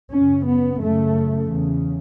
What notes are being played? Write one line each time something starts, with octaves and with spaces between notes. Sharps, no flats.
F#2 C#3 C#4
B3
F#2 C#3 A3
E2 C#3